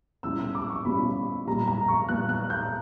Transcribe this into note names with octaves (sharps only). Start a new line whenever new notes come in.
B2 G3 C#4 E4 E6
E6
D6
C#6
B2 G3 C#4 E4 B5
A#2 G3 B3 A#5
A#5
C#6
A#2 G3 B3 F#6
F#6
G6